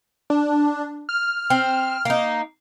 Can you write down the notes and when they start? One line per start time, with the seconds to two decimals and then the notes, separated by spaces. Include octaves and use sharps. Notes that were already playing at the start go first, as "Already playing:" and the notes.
0.30 D4
1.09 F6
1.50 C4
2.05 A#3 D#4